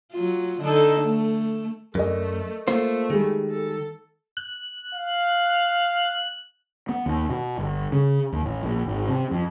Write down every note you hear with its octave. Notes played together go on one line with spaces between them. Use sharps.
F#3 F4
D3 D#4 A4
A3
F#2 A3 A#4 D5 D#5
A3 A#3 F4 C5
D#3 G3 G#3
A4
F#6
F5
B3
D#2
B2
G1
C#3
D#2
A1
A#1
G#1
C3
F2